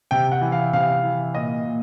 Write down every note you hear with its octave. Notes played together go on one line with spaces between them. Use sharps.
C3 G5
F#5
E3
F5
C3 F5
E3
A#2 D#5
A#2